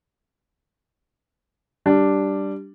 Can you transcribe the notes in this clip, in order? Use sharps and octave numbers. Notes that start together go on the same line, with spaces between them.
G3 D4